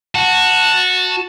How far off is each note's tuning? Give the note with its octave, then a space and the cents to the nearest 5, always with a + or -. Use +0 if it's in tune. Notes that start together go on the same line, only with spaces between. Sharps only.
F#4 -10 A5 +10